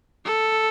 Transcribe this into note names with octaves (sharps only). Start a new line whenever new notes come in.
A4